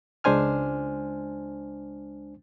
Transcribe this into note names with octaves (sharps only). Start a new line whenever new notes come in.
C#2 G#3 D4 C5 G#5 F6